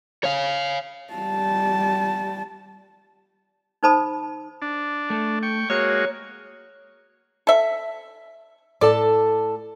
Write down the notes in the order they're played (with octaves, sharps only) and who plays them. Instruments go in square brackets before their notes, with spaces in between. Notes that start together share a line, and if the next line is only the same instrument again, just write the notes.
[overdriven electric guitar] C#5 F5
[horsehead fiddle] G3 A5
[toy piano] D#4 A#4 C5 A5 B5 D#6
[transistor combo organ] D4
[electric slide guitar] A3
[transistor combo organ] G5 C#6
[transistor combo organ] G#3 A#3 F#4 [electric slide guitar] C#5
[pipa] A4 E5
[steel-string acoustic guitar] A2 A4 A5 [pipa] D5